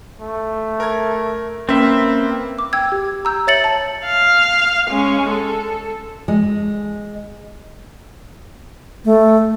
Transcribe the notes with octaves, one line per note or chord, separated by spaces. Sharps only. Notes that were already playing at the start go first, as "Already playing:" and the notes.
A3
A#4 G#6
A#3 C4 C#4 B4 E5
D6
G5 E6 G#6
G4
A#5 E6 G6
C#5 E5 A6 C#7 F#7
A5
F5
G#3 C#4
A4
G#3
A3